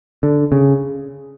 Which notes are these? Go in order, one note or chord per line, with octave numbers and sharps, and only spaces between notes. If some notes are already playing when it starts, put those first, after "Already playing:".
D3
C#3